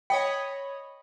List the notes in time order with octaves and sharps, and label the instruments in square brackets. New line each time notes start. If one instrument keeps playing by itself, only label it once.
[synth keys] C#5 D#5 B5 [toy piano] G5